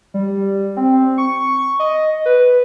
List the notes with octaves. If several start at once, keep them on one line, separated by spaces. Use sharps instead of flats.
G3
C4
C#6
D#5
B4